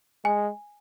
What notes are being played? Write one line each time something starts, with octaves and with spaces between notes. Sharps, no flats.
G#3 G#5